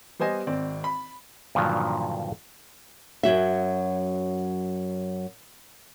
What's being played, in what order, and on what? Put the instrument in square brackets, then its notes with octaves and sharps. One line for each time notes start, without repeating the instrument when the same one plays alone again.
[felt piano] G3 B3 C5 D#5 G#5
G#1 C4 D5
B5
[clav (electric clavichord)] G2 A#2 D3 D#3 F3 F#3
[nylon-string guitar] F#2 F#3 F#4 E5